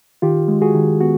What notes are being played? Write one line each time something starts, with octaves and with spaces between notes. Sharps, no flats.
D#3 F4 G4
G#3
F#4 G#4
D#3
B3 F#4